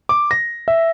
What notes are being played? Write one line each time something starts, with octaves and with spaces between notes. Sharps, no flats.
D6
A#6
E5